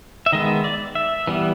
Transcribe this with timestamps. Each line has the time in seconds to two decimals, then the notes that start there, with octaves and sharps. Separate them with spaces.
0.26 E5
0.32 D#3 G#3 B3 D#5
0.64 D5
0.95 E5
1.27 E3 G3 B3